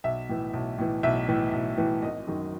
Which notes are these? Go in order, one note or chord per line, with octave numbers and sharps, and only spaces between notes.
B1 E5
A2 E3
B1
A2 E3
B1 E5
A2 E3
B1
A2 E3
G#1 D#5
F#2 D#3